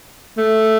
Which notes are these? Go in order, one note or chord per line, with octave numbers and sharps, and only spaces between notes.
A3